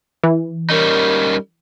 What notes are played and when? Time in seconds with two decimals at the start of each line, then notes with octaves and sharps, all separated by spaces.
0.24 E3
0.70 G3 C#4 D#4 A#4